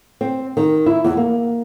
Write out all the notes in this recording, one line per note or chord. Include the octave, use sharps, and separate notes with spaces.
C4
D#3
E4
E2
A#3